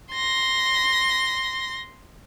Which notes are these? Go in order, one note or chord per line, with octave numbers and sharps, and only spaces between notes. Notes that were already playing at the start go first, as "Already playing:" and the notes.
C6 A#6